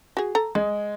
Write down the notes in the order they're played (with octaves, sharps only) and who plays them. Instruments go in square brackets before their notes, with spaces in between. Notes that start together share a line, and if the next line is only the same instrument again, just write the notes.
[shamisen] F#4 G#4
A4 A#5
[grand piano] G#3 [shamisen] G#4